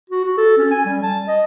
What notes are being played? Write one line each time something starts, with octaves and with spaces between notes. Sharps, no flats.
F#4
F#4
A4
C#4
G#5
G3
A5
D#5